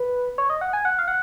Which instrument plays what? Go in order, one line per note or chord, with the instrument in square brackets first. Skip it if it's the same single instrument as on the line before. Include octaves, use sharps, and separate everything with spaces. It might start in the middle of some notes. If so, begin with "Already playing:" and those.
Already playing: [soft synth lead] B4
C#5
D#5
F#5
G#5
F#5
F5
F#5